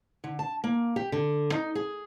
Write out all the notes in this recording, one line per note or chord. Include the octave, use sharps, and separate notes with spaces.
D3
A5
A#3
G4
D3
D#4
G#4